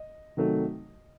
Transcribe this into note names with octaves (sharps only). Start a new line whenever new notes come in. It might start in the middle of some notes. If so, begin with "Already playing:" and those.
Already playing: D#5
C3 D#3 F#3 A3